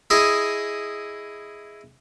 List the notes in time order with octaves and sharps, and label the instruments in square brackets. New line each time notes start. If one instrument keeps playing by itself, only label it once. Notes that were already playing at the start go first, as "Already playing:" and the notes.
[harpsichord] E4 G#4 D#5